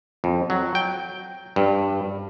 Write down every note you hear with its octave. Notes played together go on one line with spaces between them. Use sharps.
F2
F#3
G5
G2